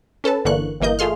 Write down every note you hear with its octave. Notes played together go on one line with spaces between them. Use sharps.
C#4 A4 B4 A5
G1 D3 E3 A#3 C#6 F#6
G1 E3 A#3 D#5 G6
A3 F4 G#4 C6 F6